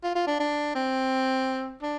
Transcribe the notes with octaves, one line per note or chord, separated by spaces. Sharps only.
F4
F4
D4
D4
C4
D4